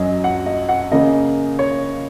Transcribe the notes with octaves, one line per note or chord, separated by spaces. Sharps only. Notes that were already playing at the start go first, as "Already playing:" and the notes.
Already playing: F#2 F#3 C#4 D#5
F#5
D#5
F#5
C#3 A#3 C#4 D#5
C#5